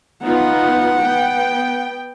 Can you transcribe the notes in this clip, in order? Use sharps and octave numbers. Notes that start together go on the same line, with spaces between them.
B3 D#4 F4 F#5
B3 G5